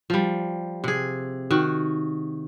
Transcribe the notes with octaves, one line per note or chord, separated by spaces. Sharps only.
F3 G3
C3 G#4
D#3 F#4